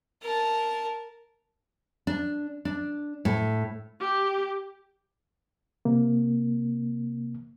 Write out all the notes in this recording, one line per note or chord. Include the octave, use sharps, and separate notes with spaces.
A#4 A5
D4
D4
A2
G4
C3 A#3